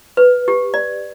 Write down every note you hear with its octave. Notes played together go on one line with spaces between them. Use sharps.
B4
G4
D5